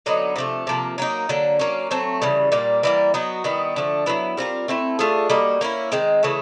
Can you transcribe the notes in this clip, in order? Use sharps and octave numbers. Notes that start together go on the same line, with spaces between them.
D3 F#3 B3 D#4
C3 F3 A3
C3 F3 A#3
F#3 A#3 D#4
D3 F#3 A#3
F#3 A#3 C#4
F#3 A3 C4
C#3 E3 G3
A#2 G3 A#3
E3 G3 A#3
F#3 B3 D#4 F#4
D#3 G3 B3 E4
D3 F3 A3
F#3 B3 E4
G3 C4 F4 A#4
A3 C4 E4
A3 D4 F4 G#4
G3 A#3 D#4 F#4
A#3 C#4 E4
D#3 G#3 C4
C#3 E3 A3